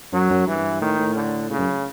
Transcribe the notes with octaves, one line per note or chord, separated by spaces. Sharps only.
F#2 F#3
F#2
G2 E3
A2 D#3
A2
D3
A2 C#3
F#2